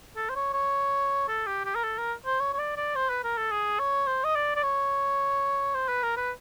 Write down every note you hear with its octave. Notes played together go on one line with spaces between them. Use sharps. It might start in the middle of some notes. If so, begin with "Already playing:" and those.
A4
C5
C#5
C#5
A4
G4
G4
A#4
A4
A#4
C5
C#5
C#5
D5
D5
C5
B4
A#4
A4
G#4
C#5
C5
D#5
D5
D5
C#5
C5
B4
A#4
B4